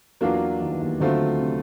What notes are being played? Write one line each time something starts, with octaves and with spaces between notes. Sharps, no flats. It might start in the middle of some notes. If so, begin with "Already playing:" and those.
E2 E3 F#3 A#3 D4 F4
D#3
E3
D#2 D#3
D2 D3 F#3 A3 C4 F4
C3